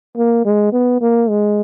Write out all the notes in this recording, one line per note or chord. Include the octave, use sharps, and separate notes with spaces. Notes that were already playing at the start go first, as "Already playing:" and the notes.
A#3
G#3
B3
A#3
G#3